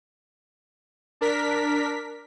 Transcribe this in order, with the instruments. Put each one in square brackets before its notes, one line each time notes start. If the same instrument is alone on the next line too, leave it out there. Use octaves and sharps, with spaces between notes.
[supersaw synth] D4 A#4 B6